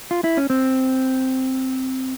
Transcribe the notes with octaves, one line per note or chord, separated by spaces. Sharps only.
F4
E4
C#4
C4